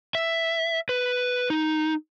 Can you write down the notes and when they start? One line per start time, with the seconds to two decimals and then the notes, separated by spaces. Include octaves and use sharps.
0.15 E5
0.89 B4
1.50 D#4